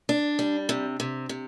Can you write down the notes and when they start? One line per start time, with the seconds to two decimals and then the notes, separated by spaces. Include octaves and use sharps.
0.09 D4
0.39 G3
0.69 C3
1.00 C3
1.29 C3